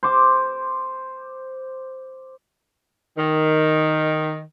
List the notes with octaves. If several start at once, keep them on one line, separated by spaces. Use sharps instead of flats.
C5 D6
D#3